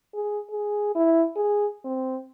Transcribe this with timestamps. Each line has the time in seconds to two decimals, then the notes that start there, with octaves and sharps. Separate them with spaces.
0.14 G#4
0.51 G#4
0.95 E4
1.36 G#4
1.85 C4